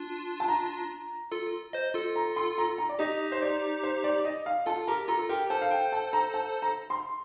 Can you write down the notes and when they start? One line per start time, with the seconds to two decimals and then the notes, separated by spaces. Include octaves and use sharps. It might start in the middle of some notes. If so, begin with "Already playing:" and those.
Already playing: D4 F4
0.40 A5
0.48 A#5
1.32 F4 A4
1.73 C5 D#5
1.94 F4 A4
2.16 A#5
2.36 C6
2.58 A#5
2.78 A#5
2.89 D5
2.99 D#4 G4 D#5
3.32 C5
3.42 D5
3.83 C5
4.04 D5
4.25 D#5
4.46 F5
4.66 F4 A4 A5
4.88 G4 A#4 A#5
5.08 F4 A4 A#5
5.19 A4
5.29 G4 A#4 G5
5.50 A4 C5 A5
5.62 F5
5.71 G5
5.92 A5
6.13 A#5
6.34 A5
6.62 A#5
6.90 C6